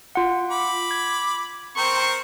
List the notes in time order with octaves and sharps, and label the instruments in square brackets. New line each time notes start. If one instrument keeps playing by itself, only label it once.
[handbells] F4 F#5
[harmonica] B5 D6
[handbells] G#6
[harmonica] C4 A#4 C5 [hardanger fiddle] C#6